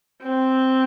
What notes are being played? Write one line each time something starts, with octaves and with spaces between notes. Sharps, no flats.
C4